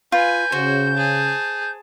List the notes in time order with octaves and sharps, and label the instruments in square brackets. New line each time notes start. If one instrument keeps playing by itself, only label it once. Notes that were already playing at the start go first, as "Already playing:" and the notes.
[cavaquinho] F4 [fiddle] B4 G#5 [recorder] G6
[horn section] C#3 [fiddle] F#4 [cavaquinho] C5
[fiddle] G#4 A5